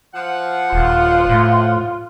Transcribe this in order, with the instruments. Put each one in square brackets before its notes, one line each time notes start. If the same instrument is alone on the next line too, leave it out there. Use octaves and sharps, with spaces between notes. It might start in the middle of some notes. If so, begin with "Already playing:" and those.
[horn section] F3 F#5
[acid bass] D#1 [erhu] F4
[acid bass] A2